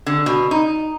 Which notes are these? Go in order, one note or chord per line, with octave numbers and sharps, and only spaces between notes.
D3
B2
D#4